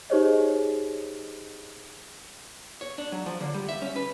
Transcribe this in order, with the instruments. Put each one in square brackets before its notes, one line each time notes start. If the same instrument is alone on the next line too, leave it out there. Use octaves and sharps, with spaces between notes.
[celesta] D#4 G4 G#4 C5 C#5 D#5
[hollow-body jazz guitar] C#5
D4
F#3
F3
D3
G3
E5
C#4
B4